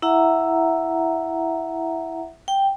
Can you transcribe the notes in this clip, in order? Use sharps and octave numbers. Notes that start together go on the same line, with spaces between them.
E4 E5 F#5 A#5
G5